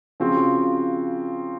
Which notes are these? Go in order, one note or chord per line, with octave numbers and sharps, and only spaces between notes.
C#3 F3 C4 F#4